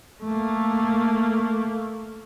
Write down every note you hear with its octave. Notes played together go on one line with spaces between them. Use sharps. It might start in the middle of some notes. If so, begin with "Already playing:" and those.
A3 A#3